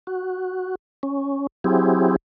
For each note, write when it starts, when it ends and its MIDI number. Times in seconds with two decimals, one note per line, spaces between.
0.07 0.75 66
1.03 1.47 61
1.64 2.16 54
1.64 2.16 60
1.64 2.16 64
1.64 2.16 67
1.64 2.16 68